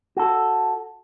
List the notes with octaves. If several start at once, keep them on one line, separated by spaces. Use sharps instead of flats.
F#4 A4